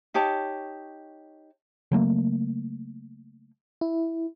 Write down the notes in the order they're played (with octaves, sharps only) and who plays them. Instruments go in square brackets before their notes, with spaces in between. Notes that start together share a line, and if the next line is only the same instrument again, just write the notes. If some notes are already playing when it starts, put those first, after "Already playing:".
[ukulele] D#4 G4 C#5 A5
[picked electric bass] C#3 F#3 A3 A#3
[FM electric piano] E4